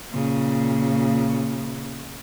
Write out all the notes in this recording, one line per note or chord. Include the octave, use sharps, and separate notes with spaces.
A#2 C#3